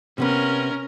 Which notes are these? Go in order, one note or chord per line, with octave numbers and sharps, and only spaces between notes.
C3 B3 C#4 A#4 B4